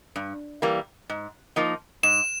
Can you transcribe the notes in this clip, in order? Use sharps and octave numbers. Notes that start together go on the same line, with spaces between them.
G2
E3 G3 A#3
G#2
F3 A#3 D#4
G#2 E7